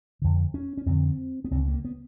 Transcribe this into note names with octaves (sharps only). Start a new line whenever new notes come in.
F2 D3
C#4
C#4
F2 D3 C4
B3
C#2 C#3 C4
A#3
B3